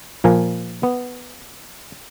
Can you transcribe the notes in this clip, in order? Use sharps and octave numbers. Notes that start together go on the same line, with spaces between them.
A#2 F3 A#4 G#5
B3